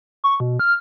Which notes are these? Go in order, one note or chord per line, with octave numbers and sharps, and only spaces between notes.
C#6
B2
F6